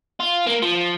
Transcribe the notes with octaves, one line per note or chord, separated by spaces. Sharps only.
F4
A#3
F3